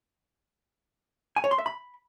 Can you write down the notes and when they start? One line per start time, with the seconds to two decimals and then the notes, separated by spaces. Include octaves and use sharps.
1.36 G#5
1.44 C#5
1.51 C6
1.59 E5
1.66 B5